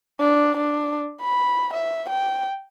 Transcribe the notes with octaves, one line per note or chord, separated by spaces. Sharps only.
D4
D4
B5
E5
G5